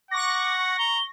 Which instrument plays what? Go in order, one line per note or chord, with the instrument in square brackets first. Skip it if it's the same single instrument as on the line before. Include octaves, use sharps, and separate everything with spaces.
[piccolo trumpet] F#5 [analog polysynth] C#6 A#6 [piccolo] D6
[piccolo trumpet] A#5 [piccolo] G7